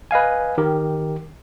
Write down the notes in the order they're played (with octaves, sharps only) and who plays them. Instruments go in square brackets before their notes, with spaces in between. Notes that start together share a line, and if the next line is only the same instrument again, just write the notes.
[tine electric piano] B4 D#5 F5 G#5
D#3 G4 A#4